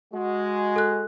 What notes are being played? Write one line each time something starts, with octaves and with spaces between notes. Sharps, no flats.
G#3 F#4
A4 F#6